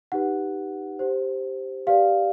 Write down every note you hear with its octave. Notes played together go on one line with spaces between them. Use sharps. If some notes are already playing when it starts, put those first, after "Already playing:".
D#4 G4 B4 F#5
G4 C5
G4 B4 D5 F5